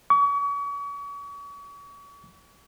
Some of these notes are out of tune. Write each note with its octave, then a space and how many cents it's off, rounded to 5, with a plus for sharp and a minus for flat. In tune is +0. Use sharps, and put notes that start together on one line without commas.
C#6 +40